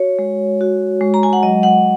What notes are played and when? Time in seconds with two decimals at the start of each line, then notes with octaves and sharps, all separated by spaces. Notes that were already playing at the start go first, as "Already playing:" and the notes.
Already playing: F#4 C#5
0.19 G#3
0.61 F#4
1.01 G#3
1.14 A#5
1.23 G#5
1.33 F#5
1.43 F#3 D#5
1.63 F#5